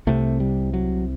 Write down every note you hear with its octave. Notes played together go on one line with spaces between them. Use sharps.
C2 C3 A3
G3
F#3